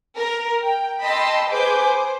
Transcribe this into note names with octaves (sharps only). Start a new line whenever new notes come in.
A#4
G5
D#5 G5 A5 B5 C6 E6
G#4 B4 C5 G#5 D6 G6
C5